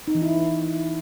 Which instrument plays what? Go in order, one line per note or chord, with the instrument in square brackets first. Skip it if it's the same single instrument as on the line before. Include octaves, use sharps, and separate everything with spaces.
[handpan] D#4
E3
E4